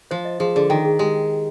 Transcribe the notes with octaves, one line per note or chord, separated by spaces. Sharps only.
F3 C5
D#5
F3 G#4
D3 G#4
D#3 G5
G#4
G#3 G4